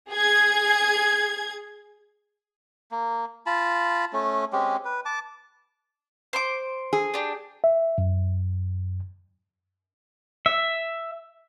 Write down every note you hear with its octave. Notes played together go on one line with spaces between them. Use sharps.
G#4 G#6
A#3
F4 A5 B5
A3 C#4
G#3 C4 C#4 G4
B4
A5 D6
C5 C6 D6
G#4
D4 G4
E5
F#2
E5